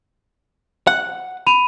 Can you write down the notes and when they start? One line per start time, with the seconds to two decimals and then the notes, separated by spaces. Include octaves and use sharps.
0.87 F#5
1.47 B5 D#7 F7